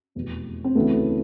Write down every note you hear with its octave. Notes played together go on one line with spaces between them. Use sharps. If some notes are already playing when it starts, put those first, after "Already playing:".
F1 E2 B2
C4
D2 C#3 E3 A3 B3